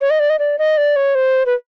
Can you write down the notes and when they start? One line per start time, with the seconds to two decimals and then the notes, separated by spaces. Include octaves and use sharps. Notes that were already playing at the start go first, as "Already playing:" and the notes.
0.01 C#5
0.10 D#5
0.20 D5
0.30 D#5
0.39 D5
0.59 D#5
0.77 D5
0.96 C#5
1.15 C5
1.46 B4